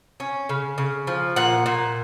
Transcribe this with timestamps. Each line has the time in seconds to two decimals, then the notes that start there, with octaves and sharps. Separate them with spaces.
0.20 C#4
0.49 C#3
0.78 C#3
1.07 F3
1.36 A#2 F#5
1.66 A#2